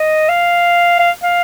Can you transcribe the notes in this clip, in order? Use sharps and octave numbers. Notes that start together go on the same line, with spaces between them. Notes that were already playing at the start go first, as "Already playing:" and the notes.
Already playing: D#5
F5
F5
F5